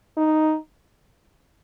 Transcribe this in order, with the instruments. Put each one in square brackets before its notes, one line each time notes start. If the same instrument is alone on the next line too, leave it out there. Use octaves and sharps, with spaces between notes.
[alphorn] D#4